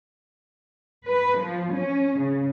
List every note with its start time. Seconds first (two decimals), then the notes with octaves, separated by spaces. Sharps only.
1.06 B4
1.38 F3
1.73 C#4
2.20 C#3